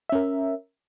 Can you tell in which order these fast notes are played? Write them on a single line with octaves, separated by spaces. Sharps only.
E5 C#4 A#4